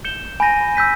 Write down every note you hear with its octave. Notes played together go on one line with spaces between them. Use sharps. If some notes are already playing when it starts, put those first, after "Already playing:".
G6 C#7 E7 G7
G#5 B5 G6 A#6 D#7
E6 G6 B6 D#7